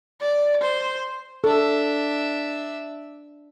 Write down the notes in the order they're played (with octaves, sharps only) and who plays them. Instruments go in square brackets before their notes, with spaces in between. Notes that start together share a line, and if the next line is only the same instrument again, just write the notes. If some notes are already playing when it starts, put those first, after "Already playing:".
[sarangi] D5
C5
[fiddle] D4 E5 [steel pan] A4